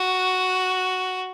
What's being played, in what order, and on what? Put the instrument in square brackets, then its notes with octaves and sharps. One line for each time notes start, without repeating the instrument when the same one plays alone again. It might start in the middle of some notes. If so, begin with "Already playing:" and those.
Already playing: [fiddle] F#4